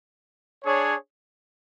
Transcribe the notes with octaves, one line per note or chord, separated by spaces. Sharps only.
D4 G#4 C#5